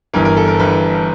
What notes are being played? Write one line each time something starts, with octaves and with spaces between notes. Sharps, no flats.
G1 G2 E3 A#4
A#4
A4
A#4
G1 G2 E3 B4